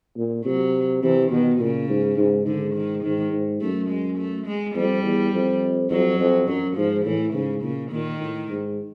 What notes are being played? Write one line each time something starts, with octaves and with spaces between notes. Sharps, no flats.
A#2
C3 F#3
C3 E3
B2 D#3
A#2 C#3
G#2
G#2
G#2 D3
D#3
G#2 D#3
G#2
F#2 A3
G#3
A3
G#3
F2 G3
E2
F2
F2 F#3
F2
F#2 F#3
G#2 F3
A2 E3
G#2 C#3
A#2 C#3
A#2 D#3
A2
G#2